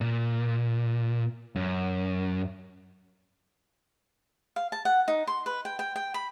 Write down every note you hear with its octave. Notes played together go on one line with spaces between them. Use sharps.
A#2
F#2
F5
A5
F#5
D#4
C6
B4
G5
G5
G5
B5